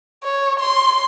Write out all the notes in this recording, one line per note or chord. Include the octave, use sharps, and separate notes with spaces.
C#5
C6